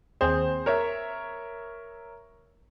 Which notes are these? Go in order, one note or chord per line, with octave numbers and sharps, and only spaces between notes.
D#2 C4 G#4 C5
A#4 C#5 E5